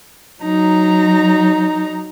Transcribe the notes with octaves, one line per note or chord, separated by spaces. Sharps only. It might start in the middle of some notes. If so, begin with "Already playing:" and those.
F#3 D#4 A#5